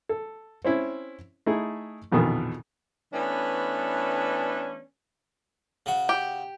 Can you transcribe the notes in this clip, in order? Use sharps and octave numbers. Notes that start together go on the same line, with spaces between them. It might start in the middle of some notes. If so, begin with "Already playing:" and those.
A4
C4 C#4 E4
A3 D#4 E4 G#4
A#1 F2 B2 D#3 E3
E3 A3 B3 C#4 D4
C#3 F#4
G4